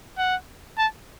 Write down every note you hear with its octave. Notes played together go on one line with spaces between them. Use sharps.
F#5
A5